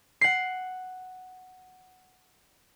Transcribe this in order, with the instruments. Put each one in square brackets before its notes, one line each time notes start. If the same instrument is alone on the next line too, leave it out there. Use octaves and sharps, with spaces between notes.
[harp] F#5 C7